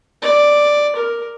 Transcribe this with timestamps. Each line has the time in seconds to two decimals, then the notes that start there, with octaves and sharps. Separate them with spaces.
0.22 D5
0.96 A#4